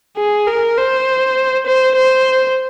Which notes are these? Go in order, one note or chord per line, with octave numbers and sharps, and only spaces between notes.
G#4
A#4
C5
C5
C5